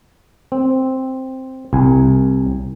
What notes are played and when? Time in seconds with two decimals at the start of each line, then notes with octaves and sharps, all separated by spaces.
0.52 C4
1.73 C2 G#5